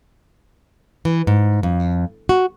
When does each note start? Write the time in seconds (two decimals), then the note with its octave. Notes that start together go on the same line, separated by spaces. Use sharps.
1.05 E3
1.27 G#2
1.63 F2
2.29 F#4